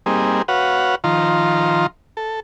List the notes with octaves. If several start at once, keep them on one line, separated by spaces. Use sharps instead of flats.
G3 A#3 C4 D#4 G#4
F#4 B4 C#5 F5 F#5
D#3 F3 F4 A#5 C6
A4